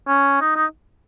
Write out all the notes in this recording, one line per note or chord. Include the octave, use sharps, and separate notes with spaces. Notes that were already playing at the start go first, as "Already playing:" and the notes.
C#4
D#4
D#4